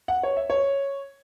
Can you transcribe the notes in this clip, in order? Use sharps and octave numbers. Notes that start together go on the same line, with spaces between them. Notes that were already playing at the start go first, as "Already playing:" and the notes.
F#5
C#5
E5
C#5